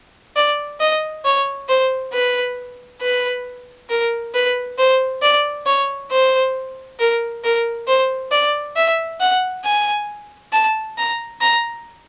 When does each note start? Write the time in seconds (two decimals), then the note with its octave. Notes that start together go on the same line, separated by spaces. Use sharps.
0.36 D5
0.80 D#5
1.25 C#5
1.69 C5
2.13 B4
3.01 B4
3.90 A#4
4.34 B4
4.78 C5
5.22 D5
5.66 C#5
6.11 C5
6.99 A#4
7.44 A#4
7.87 C5
8.32 D5
8.76 E5
9.20 F#5
9.64 G#5
10.53 A5
10.98 A#5
11.41 A#5